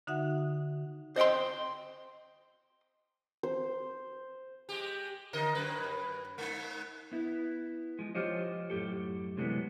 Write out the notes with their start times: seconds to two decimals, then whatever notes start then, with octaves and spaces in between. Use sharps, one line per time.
0.07 D3 D#4 F#4 E5 F#5
1.16 C5 D#5 F#5 G5 C6
3.43 C5
4.69 G#3 G4
5.33 D3 A#4 D#5
5.55 F#2 B4
6.38 G#3 D#4
7.12 B3 E4
7.99 F3 G#3
8.15 F3 F4 G4 C5 C#5 D#5
8.70 F#2 A2 G4 A4
9.37 C3 E3 F#3 G#3 A3 B3